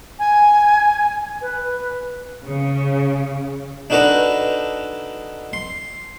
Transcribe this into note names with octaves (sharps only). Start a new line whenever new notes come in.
G#5
B4
C#3
D4 D#4 F#4 A4 B4 A#5
C6